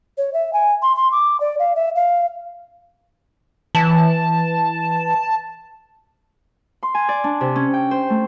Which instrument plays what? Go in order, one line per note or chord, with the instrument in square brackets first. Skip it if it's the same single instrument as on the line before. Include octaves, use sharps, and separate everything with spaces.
[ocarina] C#5
E5
G#5
C6
C6
D6
D5
F5
E5
F5
[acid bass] E3 [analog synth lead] A5
[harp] C6
G#5
D5
D4
C3
C#4
G5
C5
A3